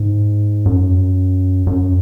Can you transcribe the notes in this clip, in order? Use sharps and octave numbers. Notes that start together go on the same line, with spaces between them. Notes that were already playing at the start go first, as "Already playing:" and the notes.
Already playing: G#2
F#2
F#2